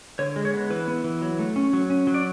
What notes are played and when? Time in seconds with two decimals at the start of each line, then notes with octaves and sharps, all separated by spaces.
0.19 D3 C#5
0.36 G#3
0.45 C#5
0.53 B3
0.70 E3 B4
0.88 B3
1.04 E3
1.22 F#3
1.39 A3
1.56 C#4
1.73 F#3
1.90 C#4
2.07 F#3
2.14 D5